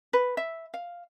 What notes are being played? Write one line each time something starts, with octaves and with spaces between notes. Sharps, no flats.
B4
E5
F5